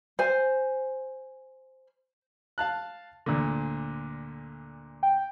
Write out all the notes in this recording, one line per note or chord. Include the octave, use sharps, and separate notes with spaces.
C5 G#5
F5 A5 F#6
D2 A#2 D3
G5